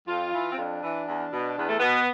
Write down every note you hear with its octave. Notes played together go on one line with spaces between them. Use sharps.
F2 F4
E3
C4
F2 D4
E3
E2
B2
E2 B3
A3
B2 B3